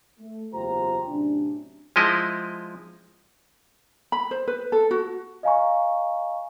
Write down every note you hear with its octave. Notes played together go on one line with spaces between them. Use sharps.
A3
F#1 E2 F4 G4 C5 A#5
A2 C3 F#3 C#4 D4
F3 G#3 E4 D#5
B5
C5
B4
A4
F#4
D#5 F5 G#5 A#5 C#6